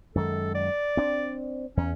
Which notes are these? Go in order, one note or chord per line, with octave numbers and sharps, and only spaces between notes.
F#2 D#3 G#3 A4
D5
C4 D4
E2 C#4